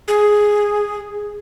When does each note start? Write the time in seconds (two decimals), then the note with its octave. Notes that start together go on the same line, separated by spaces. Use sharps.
0.08 G#4